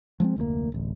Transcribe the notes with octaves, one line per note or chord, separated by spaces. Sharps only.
F3 G#3 A3 C4
F1 D2 D3 A#3
D1 A1